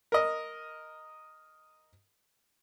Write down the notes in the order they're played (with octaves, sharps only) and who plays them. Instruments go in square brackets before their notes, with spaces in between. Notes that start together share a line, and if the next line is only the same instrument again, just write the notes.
[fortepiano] A#4 D#5